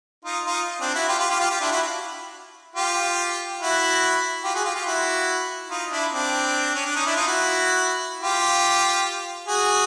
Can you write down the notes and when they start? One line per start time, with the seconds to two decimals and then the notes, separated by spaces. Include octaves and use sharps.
0.25 D#4 F4
0.46 D#4 F4
0.81 C4 D4
0.95 E4 F#4
1.08 F4 G4
1.19 F4 G4
1.30 F4 G4
1.40 F4 G4
1.50 F4 G4
1.61 D4 E4
1.72 E4 F#4
2.76 F4 G4
3.60 E4 F#4
4.44 F4 G4
4.55 F#4 G#4
4.65 F4 G4
4.75 F4 G4
4.86 E4 F#4
5.70 D#4 F4
5.90 D4 E4
6.12 C4 D4
6.75 C#4
6.85 D4
6.96 C#4 D#4
7.06 D4 E4
7.16 D#4 F4
7.27 E4 F#4
8.22 F4 G4
9.48 F#4 G#4